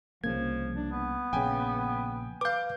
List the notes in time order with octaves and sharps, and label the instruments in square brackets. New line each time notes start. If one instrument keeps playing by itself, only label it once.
[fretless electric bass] C2 C#3 A#3 [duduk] F3 [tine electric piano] G#6
[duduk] D4
B3
[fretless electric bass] A#1 C#3 [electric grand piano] G5 G#5
[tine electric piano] B4 F5 [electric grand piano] D6 G6